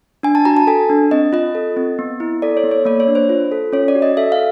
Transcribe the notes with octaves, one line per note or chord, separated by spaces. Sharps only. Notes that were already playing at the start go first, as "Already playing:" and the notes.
D4 G#5
A5
F#4 A#5
A5
A4 G#5
D4
C4 D#5
F4 D#5
A4
C4
B3
E4
A4 D5
C#5
B3
C#5
A#3 D5
C#5
D4
C5
F4
A4
C#4 C#5
D5
F#4
D#5
A4 E5
F5